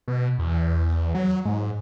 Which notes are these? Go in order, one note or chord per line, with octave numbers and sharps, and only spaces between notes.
B2
E2
F#3
G#2